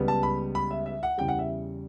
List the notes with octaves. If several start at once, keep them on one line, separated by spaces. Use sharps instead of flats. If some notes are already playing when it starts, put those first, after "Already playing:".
Already playing: C#2 C#3 G3 B3
A5
B5
B5
E5
E5
F#5
E2 C#3 G3 G5
F#5
E5